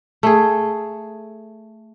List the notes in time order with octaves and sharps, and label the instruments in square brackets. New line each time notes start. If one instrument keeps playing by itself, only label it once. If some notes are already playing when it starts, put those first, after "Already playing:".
[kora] A3 G#4